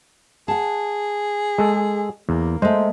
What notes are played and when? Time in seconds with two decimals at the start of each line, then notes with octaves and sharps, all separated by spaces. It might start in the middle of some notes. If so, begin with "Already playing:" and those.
0.48 G#4 F#5 A5
1.58 G#3 A4
2.29 E2 A#3
2.62 G#3 A3 C5